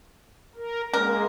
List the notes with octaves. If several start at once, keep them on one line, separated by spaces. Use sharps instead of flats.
A#4
G#3 A#3 A#4